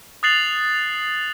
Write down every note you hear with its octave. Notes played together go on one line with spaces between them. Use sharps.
D#6 F#6 A6 C7 F7 F#7